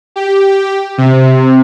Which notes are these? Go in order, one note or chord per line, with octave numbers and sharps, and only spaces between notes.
G4
C3